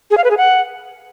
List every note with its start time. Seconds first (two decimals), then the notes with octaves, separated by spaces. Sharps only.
0.11 G#4
0.17 F5
0.24 B4
0.31 G#4
0.37 F#5